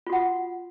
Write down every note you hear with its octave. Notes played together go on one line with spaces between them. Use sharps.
F4 F#4 F#5